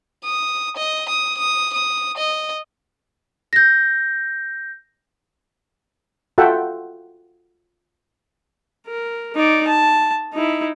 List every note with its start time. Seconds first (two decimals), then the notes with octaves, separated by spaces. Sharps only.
0.25 D#6
0.77 D#5
1.09 D#6
1.38 D#6
1.74 D#6
2.18 D#5
3.53 G6 A#6
6.38 F4 F#4 A4 E5 F#5 G5
8.87 A#4
9.36 D#4 D5
9.68 A5
10.33 D#4 E4